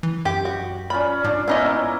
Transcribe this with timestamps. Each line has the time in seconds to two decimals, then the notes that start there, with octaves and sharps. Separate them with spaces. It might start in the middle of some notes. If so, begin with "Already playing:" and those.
0.03 E3
0.25 F#2 G4
0.45 F#4
0.90 A#2 C#4 B5
1.24 G#2 D4
1.48 A#3 B3 C#4 D#4 E4 D#5